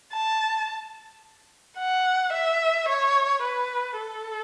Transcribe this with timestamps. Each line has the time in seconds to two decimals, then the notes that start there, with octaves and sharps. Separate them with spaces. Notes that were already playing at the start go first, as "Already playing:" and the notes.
0.13 A5
1.79 F#5
2.34 E5
2.89 C#5
3.43 B4
3.98 A4